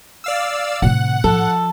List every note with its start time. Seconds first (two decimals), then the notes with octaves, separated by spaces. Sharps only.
0.24 D5 F5 E6
0.82 A2 C3 D#3 F#5
1.24 F3 A4